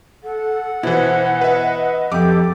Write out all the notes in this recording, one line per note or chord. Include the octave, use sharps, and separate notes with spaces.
A4 F#5
B2 E3 E4 C5
B4 D#5 E5
F2 G4 A4 D6